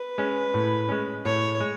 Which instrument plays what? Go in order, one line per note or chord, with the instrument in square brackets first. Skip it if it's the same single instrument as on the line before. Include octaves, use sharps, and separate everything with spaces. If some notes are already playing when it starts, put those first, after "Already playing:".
Already playing: [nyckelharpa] B4
[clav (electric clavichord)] G#3 C#4
A2
G#3 C#4
[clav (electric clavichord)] A2 [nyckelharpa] C#5
[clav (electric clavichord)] G#3